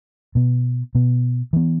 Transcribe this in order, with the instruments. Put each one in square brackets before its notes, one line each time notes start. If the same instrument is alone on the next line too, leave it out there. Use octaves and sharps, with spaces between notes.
[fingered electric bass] B2 B3
B2 B3
E3 B3